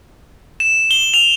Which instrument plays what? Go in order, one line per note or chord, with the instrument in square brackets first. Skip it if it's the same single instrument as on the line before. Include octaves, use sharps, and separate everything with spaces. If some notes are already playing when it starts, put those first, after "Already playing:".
[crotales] E7
G7
F7